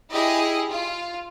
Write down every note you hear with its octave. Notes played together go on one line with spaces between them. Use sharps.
E4 G4 G#4 D#5
F4